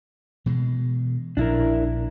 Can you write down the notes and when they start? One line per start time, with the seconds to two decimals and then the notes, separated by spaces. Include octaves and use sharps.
0.46 B2 E3 G#3
1.37 A#1 E3 D4 E4 A#4